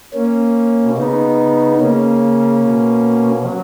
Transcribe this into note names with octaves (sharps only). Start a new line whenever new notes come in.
A#3 C#4
B2
C#3 B3 D#4
C#3 A#3 C#4
B2
F#3